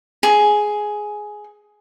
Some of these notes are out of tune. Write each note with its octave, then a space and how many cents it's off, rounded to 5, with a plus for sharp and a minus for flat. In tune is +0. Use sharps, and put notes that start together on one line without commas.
G#4 +10